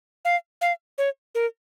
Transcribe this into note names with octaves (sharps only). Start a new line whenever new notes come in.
F5
F5
C#5
A#4